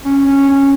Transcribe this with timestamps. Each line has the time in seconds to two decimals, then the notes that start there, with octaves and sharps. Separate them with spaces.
0.05 C#4
0.26 C#4
0.49 C#4